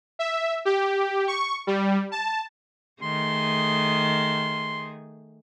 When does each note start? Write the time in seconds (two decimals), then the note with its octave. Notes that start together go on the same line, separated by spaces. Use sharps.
0.19 E5
0.65 G4
1.28 C#6
1.67 G3
2.12 A5
3.02 D#3 A3 G#4 C6